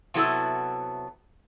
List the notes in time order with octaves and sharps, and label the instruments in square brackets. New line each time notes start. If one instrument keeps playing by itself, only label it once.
[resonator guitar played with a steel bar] C3 F#3 B3 E4 F#4 A4